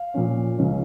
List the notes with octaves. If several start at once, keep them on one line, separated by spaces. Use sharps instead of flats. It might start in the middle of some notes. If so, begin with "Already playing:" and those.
Already playing: F5
A#2 F3 C#4
C#2 C#3 F3 C#4